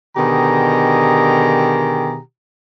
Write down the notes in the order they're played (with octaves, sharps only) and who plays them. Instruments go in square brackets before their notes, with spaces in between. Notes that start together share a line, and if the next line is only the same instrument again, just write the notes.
[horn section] B2 D3 D#3 G4 G#4 A#5